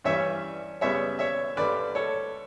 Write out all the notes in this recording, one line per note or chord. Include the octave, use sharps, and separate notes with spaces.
G2 E3 G3 C#4 C#5 E5
F#2 C#3 G3 B3 C#5 E5
C#5 E5
G2 D3 G3 D4 B4 D5
A4 C#5